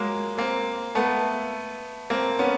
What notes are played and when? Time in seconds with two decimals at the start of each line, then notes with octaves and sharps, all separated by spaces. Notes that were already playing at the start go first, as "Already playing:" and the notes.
Already playing: F#3 G#3 A#3
0.38 A#3 C4
0.95 A3 B3
2.10 A#3 C4
2.39 B3 C#4